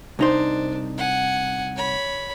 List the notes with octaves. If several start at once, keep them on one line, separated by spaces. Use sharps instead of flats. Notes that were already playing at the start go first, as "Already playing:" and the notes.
C2 D4 D#4 C5
F#5 G#5
C#5 B5